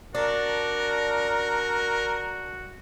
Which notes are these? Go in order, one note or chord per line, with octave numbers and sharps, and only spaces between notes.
D4 F#4 A#4